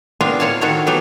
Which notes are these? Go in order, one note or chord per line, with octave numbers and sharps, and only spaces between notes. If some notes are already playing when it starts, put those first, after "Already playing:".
B3 C4 D4 F4 A#4
A2 F4 A#4 C#5 F5 A5
D#3 C4 F#4 A4 A#4 C#5
E3 F#3 B3 G4 A4 A#4